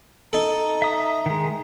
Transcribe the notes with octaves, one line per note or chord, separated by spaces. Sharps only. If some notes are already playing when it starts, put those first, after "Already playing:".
D#4 A4 A#5
E5 D#6
D#3 G#3